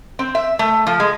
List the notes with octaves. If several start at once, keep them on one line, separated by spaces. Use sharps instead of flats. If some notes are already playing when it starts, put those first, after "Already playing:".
C4
E5
A3
F3
G#3